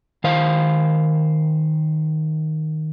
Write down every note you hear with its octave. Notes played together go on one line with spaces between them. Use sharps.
D#3 C5 F5